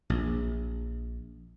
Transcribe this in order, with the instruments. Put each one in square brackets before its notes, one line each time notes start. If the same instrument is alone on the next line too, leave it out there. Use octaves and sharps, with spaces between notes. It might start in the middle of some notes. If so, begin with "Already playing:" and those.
[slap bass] A#1